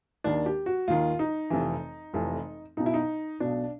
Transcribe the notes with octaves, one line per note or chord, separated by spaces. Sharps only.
D#2 D#3 D4
G4
F#4
D#2 D#3 F4
D#4
F1 F2 C3 E3
F1 F2 C3 E3
B1 B2 D#4
E4
D#4
B1 B2 D4